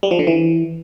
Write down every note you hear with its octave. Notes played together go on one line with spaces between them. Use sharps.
G3
F3
D3
E3